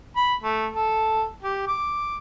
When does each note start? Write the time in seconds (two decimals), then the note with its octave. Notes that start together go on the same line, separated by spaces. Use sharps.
0.16 B5
0.43 A3
0.73 A4
1.43 G4
1.68 D6